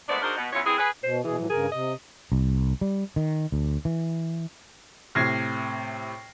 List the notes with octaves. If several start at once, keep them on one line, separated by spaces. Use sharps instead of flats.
G#3 A3 B3 C4 D4 D5
D4 D#4 F#4 G#4 A#4 C5
B2
E2 C#3 E4 F4 C#5
E3 C4 E4 G#4
G#4 B4
B2 C5
B2 E3 G#4
A2 F3 F#3
G2 C#3 G#4 A#4
C3 D#5
C2
G3
D#3
D2
E3
A2 C3 F6 G#6 A#6 C7